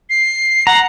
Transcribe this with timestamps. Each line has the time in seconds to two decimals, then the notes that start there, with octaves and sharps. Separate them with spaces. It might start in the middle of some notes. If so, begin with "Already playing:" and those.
0.10 C7
0.67 F#5 A#5